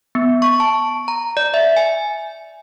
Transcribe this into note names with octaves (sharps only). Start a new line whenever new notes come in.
B3
C#6
A5
A#5
D5
E5
G#5